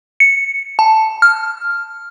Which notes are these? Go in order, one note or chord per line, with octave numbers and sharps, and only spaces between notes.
C#7
A5
F6